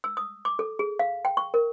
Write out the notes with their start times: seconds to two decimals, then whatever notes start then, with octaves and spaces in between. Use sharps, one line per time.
0.04 E6
0.17 D#6
0.45 D6
0.59 A4
0.79 G#4
0.99 F5
1.25 G5
1.37 C#6
1.54 A#4